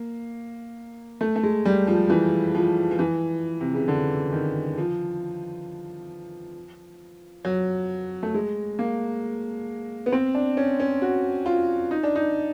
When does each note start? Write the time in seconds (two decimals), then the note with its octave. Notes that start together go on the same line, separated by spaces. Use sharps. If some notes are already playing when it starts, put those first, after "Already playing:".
Already playing: A#3
1.21 A3
1.36 A3
1.43 G#3
1.65 G3
1.87 F3
2.10 E3
2.55 F3
2.91 F3
2.99 E3
3.61 C3
3.74 C#3
3.88 D3
4.32 D#3
4.78 F3
7.45 F#3
8.23 A3
8.34 G#3
8.79 A#3
10.06 B3
10.12 C4
10.35 D4
10.57 C#4
10.80 C#4
11.02 F#4
11.46 F4
11.91 D#4
12.03 D4
12.16 D#4